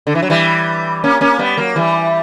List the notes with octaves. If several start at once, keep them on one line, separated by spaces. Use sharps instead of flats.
D3
E3
F#3
E3 G3
A#3 C#4
A#3 C#4
G3 B3
F#3 A#3
E3 G3